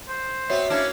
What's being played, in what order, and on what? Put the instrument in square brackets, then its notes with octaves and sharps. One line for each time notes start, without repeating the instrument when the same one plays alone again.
[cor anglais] C5
[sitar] B3 C4 [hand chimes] F#4 C#5 C7 [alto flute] E5
[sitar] A#3 D4 E4 [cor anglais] C#4